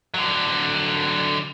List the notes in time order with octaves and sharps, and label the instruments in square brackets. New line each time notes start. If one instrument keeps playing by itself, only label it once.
[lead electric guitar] D3 F#3